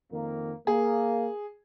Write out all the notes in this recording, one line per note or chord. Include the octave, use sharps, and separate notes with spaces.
F2 D#3 A#3
A#3 G#4